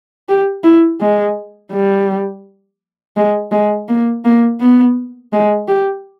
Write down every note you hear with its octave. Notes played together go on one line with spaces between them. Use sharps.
G4
E4
G#3
G3
G#3
G#3
A#3
A#3
B3
G#3
G4